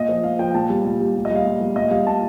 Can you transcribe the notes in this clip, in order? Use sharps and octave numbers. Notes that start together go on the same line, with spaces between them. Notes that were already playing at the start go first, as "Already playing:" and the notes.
Already playing: A#2 D#5
F3
A#2 F5
F3 G5
A#2 A5
G3
A#2
G3
A#2
D#5
G3
F5
A#2
G3
A#2 D#5
G3 F5
A#2 A5